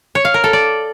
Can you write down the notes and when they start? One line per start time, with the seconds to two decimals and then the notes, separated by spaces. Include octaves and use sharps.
0.15 C#5
0.25 F5
0.34 A#4
0.44 A4
0.53 D5